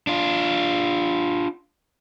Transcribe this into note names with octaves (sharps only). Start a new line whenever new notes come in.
D4 F4